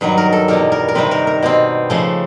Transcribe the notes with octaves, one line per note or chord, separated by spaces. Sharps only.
G2 D#3 F#3 B4
A#4
A4
E2 B2 G3 A#4
A#4
A#4
C3 D#3 G3 C4 B4
A#4
A#4
B2 G3 C4
C#3 F3 A3